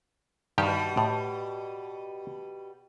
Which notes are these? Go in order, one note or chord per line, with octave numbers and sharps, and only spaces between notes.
G2 B2 D#3 G3 G4
A2